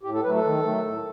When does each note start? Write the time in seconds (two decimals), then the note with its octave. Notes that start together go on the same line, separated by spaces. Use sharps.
0.03 A2 G4
0.14 A4
0.23 F#3 A3 B4
0.34 A4
0.44 D#3
0.63 F#3 A3
0.84 A2